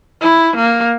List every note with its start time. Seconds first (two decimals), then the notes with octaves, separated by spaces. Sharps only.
0.21 E4
0.56 A#3